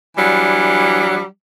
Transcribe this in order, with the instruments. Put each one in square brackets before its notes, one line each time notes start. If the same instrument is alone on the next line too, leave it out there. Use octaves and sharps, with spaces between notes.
[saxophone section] E3 F#3 G3 D4